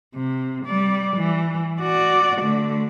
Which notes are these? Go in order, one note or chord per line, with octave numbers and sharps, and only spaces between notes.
C3
G3 D5
E3
F#4 D5
D3 A3